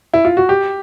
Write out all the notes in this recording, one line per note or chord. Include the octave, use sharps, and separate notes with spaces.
E4
F4
F#4
G4